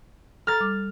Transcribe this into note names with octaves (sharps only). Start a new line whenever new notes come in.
A4 A#5 F6 A6
G3 D6